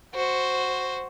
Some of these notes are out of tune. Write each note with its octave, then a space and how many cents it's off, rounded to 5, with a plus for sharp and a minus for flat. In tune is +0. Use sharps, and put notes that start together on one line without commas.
F#4 +0 C5 +5